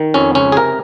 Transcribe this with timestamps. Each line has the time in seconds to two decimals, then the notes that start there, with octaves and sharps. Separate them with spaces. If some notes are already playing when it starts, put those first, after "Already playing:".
Already playing: D#3
0.14 F2 C#4
0.35 C#2 C#4
0.52 G#4
0.56 C3 A#4